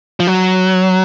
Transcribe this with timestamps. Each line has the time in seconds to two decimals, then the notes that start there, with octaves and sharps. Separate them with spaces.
0.20 F3
0.27 F#3